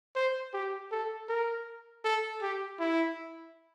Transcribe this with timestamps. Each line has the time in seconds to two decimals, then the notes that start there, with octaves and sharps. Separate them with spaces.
0.15 C5
0.54 G4
0.92 A4
1.29 A#4
2.05 A4
2.42 G4
2.80 E4